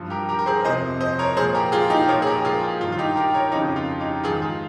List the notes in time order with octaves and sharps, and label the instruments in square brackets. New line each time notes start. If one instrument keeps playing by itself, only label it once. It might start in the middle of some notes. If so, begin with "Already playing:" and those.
Already playing: [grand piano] G2 F3
G4 A#4
G4 A#4
A#4
G#4 C5
F2 C3 F3 C5 D#5
C5 D#5
A#4 C#5
A#2 F3 G#4 C5
G4 A#4
F4 G#4
D#4 G4
A#2 F3 A#4 C#5
G#4
G4 A#4
F4 G#4
F4
G2 D#3 F4
F4
D#4 G4
G4 A#4
A#4 C#5
F2 C#3 F3 D#4 G4
F4
D#4 G4
G#2 D#3 F4 G#4
F4